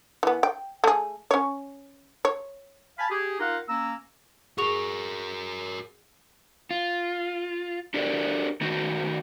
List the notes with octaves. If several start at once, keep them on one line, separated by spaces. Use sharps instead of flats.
E3 B3
G5
A3 G#4
C#4 C#5
C#5
F5 G#5 A5 B5
G4 G#4
D#4 F4 A#4 F5 F#5
A#3 C#4 A#5 E6
F#4 G#4 A#4 C#6 F7
F4
D4 F#4 G4 A4 A#4 D5
D#3 A3 D#4 F#4